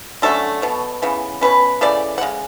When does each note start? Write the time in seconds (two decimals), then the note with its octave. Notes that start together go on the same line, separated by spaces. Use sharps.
0.22 D3 F#3 A3 C#4 A4
0.62 B2 F#3 B3
1.02 C#3 E3 B3
1.41 B2 G#3 C#4 B4
1.81 C#3 E3 A3 D5
2.18 F#5
2.21 C#3 G#3